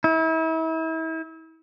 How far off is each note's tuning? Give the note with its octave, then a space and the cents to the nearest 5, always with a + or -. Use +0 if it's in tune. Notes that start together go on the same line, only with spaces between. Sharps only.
E4 -35